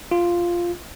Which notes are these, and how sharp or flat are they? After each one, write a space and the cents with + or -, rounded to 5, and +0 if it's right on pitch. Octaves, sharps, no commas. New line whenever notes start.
F4 -5